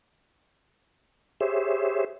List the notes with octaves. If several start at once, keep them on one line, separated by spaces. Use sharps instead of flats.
G4 G#4 C5 C#5 E5